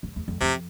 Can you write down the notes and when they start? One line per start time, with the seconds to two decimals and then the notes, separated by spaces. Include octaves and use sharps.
0.03 E2
0.16 E2
0.28 F2
0.41 F2 C3